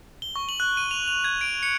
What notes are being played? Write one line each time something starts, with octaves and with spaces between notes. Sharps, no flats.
G7
C#6
F#7
F#6
D#7
F7
F7
G#6
D7
C#7